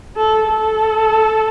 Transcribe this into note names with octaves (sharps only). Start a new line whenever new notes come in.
A4
A4